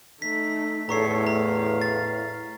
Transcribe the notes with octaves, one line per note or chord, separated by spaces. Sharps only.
A3 D#4 B6
E2 A2 A4 C#5 A#5 C#6 C7
F5 A#5
A6